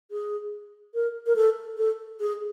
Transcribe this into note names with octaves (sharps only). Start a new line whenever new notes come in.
G#4
A#4
A#4
A4
A4
G#4